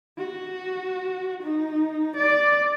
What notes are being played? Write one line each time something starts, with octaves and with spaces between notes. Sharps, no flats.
F#4
D#4
D5